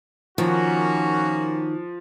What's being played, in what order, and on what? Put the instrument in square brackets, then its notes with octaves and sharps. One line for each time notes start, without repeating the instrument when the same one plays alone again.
[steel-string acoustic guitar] D#3 [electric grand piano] F3 [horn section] A#3 C#4 F#4